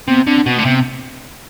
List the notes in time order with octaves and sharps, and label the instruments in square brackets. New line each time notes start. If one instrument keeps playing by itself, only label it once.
[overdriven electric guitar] C3 [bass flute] B3
[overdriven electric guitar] D3 [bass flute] C4
[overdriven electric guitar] B2 [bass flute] B3
[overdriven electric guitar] D3 [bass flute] A3
[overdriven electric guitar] C3 [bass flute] B3